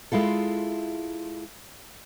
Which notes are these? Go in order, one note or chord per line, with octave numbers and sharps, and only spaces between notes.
G#3 E4 F4 A4